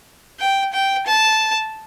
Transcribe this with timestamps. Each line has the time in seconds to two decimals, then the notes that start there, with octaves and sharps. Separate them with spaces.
0.39 G5
0.72 G5
1.06 A5